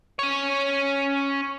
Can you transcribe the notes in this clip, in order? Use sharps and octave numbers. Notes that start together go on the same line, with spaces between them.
C#4 C#5